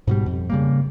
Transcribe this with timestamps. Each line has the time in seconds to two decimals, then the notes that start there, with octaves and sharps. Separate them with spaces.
0.07 G#2 B2 G3
0.26 F2
0.50 C#3 G3 A#3